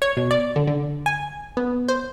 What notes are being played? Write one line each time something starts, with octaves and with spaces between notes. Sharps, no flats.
C#5
B2
D5
D3
D3
G#5
B3
C5